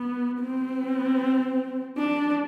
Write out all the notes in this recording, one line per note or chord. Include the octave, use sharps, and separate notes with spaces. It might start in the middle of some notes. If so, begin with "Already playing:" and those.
Already playing: B3
C4
D4